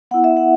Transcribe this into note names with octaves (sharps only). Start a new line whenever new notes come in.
B3 E4 F#5
E5
F#5